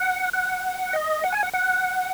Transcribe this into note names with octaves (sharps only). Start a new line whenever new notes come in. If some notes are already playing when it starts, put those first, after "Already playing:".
Already playing: F#5
F#5
D#5
F#5
G#5
F#5
F#5